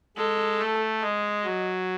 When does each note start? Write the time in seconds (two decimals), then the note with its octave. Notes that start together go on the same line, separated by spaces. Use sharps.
0.17 G#3 A4
0.59 A3
1.02 G#3 D#5
1.45 F#3